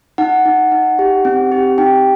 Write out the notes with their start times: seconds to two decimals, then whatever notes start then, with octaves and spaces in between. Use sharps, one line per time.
0.18 D#4 F#5
0.45 D#4
0.72 D#4
0.99 G4
1.25 C4
1.52 G4
1.78 D#4 G5